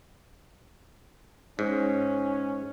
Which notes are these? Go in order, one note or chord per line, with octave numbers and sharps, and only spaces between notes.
G#2 C#4